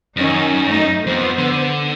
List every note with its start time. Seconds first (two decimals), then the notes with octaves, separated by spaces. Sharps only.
0.17 F#2 D#3 C#4 D#4
0.67 A3 D#4
1.07 F2 B3 C5
1.39 D3